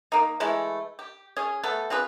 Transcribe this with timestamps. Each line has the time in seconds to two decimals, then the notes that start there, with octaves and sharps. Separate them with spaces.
0.12 A#3 D#4
0.40 E3 G#3 A3 E4
0.99 G4
1.36 C#4 G#4
1.63 A3 B3 A4
1.90 C4 F4 G#4 B4